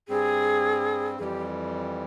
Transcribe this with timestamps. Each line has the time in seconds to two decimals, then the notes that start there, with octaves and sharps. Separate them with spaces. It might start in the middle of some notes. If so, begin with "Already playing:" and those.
0.08 G2 G3 C4 G#4
1.18 F2 E3 G3 G4 G#4